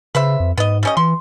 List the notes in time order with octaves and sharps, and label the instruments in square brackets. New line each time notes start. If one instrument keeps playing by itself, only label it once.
[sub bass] C#3 [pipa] B4 C5 E5
[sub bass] F2
[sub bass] G#2 [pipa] B3 D#5
[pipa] G3 C#4 D#5
[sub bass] E3 [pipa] C6